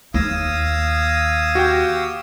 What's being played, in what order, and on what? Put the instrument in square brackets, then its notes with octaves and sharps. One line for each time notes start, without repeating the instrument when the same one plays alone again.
[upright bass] D#2 [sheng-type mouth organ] F5 D#6 E6 [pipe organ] G#6 A#6
[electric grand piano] F#4 G4 G5